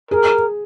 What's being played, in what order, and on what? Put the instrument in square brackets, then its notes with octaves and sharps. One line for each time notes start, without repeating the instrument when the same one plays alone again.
[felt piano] G#4 [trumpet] A#4